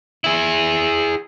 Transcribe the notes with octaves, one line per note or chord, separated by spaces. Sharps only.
E4 G#4